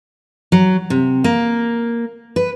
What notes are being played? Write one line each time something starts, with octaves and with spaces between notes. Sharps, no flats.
F#3
C3
A#3
B4